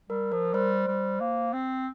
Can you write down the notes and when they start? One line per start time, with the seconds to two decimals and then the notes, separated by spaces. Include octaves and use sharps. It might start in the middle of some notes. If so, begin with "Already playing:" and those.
0.10 G3 A#4
0.32 F3 A#4
0.54 G3 C5
0.87 G3
1.20 A#3
1.53 C4